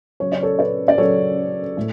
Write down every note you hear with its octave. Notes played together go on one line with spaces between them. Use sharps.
C#3 F#3 C#5
D5
A4 C#5
B4 D5
D5
C#3 F#3 A4 C#5
A2